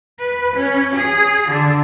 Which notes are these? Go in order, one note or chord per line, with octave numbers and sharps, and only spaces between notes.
B4
C#4
G#4
D3